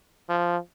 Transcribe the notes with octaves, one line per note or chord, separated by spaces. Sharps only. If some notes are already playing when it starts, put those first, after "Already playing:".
F3